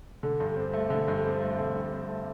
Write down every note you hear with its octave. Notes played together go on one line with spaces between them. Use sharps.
D3
G2
C4
A3
D3
G2
C4
A3
D3
G2
C4
A3